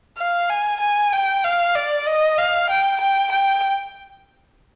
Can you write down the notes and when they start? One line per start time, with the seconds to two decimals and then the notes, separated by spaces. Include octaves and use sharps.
0.18 F5
0.50 G#5
0.80 G#5
1.13 G5
1.44 F5
1.75 D5
2.07 D#5
2.38 F5
2.70 G5
3.01 G5
3.32 G5